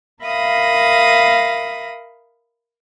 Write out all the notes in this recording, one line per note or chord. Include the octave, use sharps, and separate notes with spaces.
A#4 E5 F5 B5 D#6 A#6